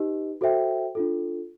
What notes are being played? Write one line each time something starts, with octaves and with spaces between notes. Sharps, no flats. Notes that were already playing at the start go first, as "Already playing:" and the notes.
Already playing: D#4 G4 B4 D#5
F#4 A4 C5 E5 G5
D4 F4 A4